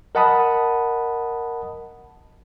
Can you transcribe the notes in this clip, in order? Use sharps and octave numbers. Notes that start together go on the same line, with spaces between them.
A#4 D#5 F#5 A5 B5 D#6